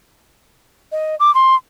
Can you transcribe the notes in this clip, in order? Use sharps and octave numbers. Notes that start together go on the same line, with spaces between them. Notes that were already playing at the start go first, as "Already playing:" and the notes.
D#5
D6
C6